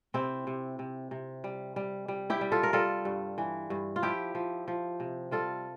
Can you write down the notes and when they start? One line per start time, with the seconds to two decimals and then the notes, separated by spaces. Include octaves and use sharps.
0.14 C3 C4 E4
0.47 C3
0.79 C3
1.11 C3
1.44 G3
1.76 G3
2.08 G3
2.30 E4 G4
2.41 G3
2.52 F4 A4
2.63 A#4
2.73 G3 F4 A4
3.05 G2
3.38 E3
3.70 G2
3.96 F4
4.02 F3 E4 G4
4.35 F3
4.68 F3
5.00 C3
5.31 G3 F4 A4